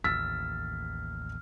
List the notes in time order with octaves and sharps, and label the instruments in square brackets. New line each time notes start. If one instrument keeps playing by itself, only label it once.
[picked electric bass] A1 D#2 [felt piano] E6 A6 B6 [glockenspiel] F6